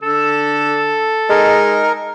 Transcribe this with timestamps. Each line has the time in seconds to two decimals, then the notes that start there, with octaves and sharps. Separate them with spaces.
0.02 D3 A4 E6
1.30 G#3 D#4 A#4